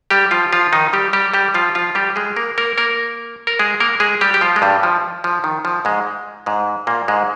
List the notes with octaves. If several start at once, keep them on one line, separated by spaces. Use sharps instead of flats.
G3 G4
F3 F4
F3 F4
D#3 D#4
G3 G4
G3 G4
G3 G4
F3 F4
F3 F4
G3 G4
G#3 G#4
A#3 A#4
A#3 A#4
A#3 A#4
A#4
G#3 G#4
A#3 A#4
G#3 G#4
G3 G4
G4
F3 F4
G#3
G2 G3
F3
F3
D#3
F3
G#2 G#3
G#2 G#3
A#2 A#3
G#2 G#3